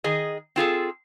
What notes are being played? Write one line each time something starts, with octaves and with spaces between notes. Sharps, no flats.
D#3 G#4 D#5
C4 F4 G#4 A4